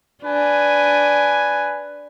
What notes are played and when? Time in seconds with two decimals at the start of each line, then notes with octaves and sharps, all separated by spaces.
0.23 D4 B4 G#5